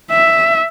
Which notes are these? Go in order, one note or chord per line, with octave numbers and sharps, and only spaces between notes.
E5